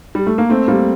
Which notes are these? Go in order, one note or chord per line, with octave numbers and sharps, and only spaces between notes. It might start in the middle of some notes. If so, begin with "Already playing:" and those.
G3
A3
A#3
A3 C4
G3 A#3